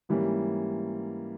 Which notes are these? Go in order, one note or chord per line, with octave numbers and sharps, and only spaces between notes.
G#2 E3 G3 A#3 C#4